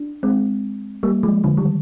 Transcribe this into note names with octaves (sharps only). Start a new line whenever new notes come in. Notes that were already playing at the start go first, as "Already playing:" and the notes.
Already playing: D4
G#3 C4
G3 A#3
F3 G#3
D3 F3
D#3 G3